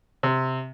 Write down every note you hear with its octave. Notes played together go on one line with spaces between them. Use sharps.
C3